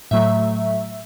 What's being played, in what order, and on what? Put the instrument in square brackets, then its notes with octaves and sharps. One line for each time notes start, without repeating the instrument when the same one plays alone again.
[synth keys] A2 F#3 A3 E5